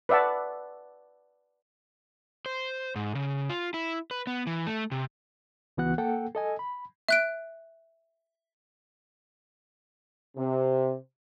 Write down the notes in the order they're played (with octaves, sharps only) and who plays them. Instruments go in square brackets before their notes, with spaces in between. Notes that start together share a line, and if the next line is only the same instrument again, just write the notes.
[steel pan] B4 D5 E5 F#5 A5
[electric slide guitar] C5
G#2
C#3
F4
E4
B4
B3
E3
A3
C3
[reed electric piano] C#2 E3 B3 F#4 F#5 F#6
A#3 A4 F#5 G5
A4 D#5 G#5
B5
[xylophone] E5 F#6 D7
[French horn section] C3